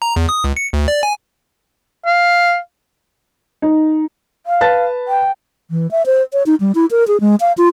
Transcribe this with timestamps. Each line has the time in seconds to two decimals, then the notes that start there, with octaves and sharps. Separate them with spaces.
0.02 A#5
0.16 E2
0.29 D#6
0.44 C#2
0.57 C#7
0.73 D2
0.88 D5
1.03 G#5
2.06 F5
3.62 D#4
4.46 F5
4.61 B4 A5 A6
5.08 G5
5.71 E3
5.91 E5
6.06 C5
6.33 C#5
6.46 D#4
6.60 G3
6.75 E4
6.91 A#4
7.08 G#4
7.21 G#3
7.40 F5
7.58 F4